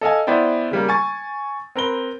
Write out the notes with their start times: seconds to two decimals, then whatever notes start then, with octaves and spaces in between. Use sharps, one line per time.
0.01 A4 D#5 F5 G#5
0.27 B3 E4 C5 D5 G5
0.71 C#3 G3 A#3
0.89 G#5 C#6 A6
1.76 C4 A#4 B4 G7